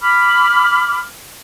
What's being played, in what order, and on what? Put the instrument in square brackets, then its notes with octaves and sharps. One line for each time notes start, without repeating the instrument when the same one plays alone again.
[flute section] B5 D6 F6